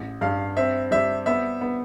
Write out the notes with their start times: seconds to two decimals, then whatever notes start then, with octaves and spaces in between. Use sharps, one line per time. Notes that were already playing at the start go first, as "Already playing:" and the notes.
Already playing: A1
0.21 G2 F5
0.57 C4 E5
0.91 G3 E5
1.26 B3 E5
1.61 B3